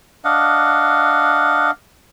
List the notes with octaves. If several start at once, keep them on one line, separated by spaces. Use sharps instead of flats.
D4 D#5 F5 F#5